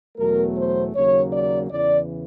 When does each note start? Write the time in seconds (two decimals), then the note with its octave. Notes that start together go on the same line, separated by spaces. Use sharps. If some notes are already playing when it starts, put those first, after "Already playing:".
0.17 E2 B2 F#3 A3 A#4
0.56 C5
0.94 D#2 C#3 F#3 A#3 C#5
1.32 D5
1.70 E2 C#3 E3 D5